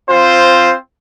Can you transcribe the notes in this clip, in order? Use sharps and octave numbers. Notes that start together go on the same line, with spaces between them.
C4 F4 C5